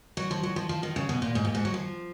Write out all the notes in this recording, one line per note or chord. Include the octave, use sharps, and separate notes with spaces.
F#3
F3
F#3
F3
F3
D#3
C#3
B2
A#2
G#2
A#2
G#2
F#3
F3